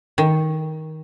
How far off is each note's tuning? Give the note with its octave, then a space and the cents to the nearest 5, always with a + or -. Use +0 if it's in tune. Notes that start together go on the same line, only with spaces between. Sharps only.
D#3 +15